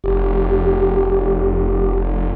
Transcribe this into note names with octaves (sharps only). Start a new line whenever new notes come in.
F1 G4